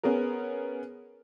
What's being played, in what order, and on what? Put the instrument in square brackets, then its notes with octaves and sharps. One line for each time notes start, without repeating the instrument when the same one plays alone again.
[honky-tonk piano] B3 C#4 G#4 A#4